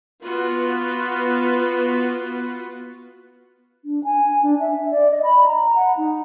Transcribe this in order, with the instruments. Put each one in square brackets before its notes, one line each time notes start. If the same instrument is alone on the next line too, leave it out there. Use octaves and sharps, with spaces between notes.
[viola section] B3 F4 F#4 B4
[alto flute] D4
G#5
D4
E5
D5
D#5
B5
A#5
F#5
D#4